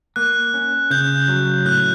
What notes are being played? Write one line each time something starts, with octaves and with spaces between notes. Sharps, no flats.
A#3 F#6
C#4
C#3 G6
F#3
A2 F#6